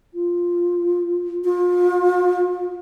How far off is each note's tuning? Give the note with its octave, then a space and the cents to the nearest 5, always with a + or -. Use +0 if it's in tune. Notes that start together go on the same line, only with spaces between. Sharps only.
F4 +0
F4 +35